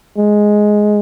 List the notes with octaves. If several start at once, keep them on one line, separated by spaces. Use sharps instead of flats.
G#3